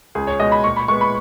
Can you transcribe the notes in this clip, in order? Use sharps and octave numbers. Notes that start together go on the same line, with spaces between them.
C#2 G#4
C#5
B2 G#3 D#5
B5
A#2 C#6
B5
G#3 B3 C#6
B5